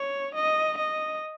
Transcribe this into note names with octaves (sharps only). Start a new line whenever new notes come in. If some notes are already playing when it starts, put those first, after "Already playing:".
Already playing: C#5
D#5
D#5